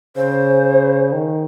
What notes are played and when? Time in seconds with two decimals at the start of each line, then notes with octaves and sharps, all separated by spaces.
0.16 C#3 C5
1.12 D#3